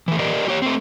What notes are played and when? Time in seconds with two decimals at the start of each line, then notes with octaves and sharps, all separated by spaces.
0.08 E3 A3
0.19 G4 A#4 D5 D#5
0.48 G4 C#5
0.62 A3 C4